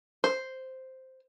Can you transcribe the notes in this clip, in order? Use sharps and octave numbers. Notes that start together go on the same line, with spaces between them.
C5